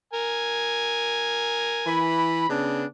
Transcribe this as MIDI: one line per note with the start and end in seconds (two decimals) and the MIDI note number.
0.13 2.07 70
0.13 2.07 80
1.87 2.49 52
1.87 2.49 83
2.50 2.86 49
2.50 2.86 59
2.50 2.86 62